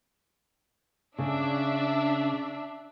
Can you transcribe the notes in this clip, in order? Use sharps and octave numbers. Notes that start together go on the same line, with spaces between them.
C#3 D4 E5